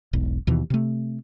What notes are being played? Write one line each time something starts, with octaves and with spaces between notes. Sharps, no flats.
E1 B1
D#2 B2 E3
C3 A3